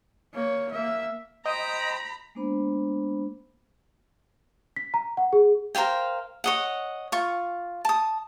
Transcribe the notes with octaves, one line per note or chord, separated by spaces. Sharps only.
A#3 C#5
A#3 E5
C5 D#5 G5 A#5 B5
G#3 A#3 B3 D4 C5 B5
B6
A#5
F#5
G#4
A#4 C5 F5 G5
C#5 D#5 F#5
F4 C#6
A5 D#6